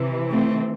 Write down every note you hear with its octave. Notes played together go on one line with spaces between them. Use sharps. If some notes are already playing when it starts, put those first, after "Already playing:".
Already playing: C3 E3
A3 C4